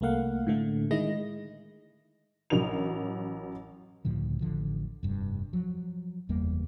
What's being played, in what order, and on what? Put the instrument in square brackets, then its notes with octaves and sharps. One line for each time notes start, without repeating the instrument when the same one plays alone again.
[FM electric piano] C2 A3 A#3 F5 F#5
A2 D3 A3
D#3 G#3 E4 D#5 A#6
[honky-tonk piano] A1 F#3 A#4 F7
[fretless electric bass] C#2 A2 D3 F3
A1 D3 F3
F1 G2
F3 F#3
F#1 E2 G3 A#3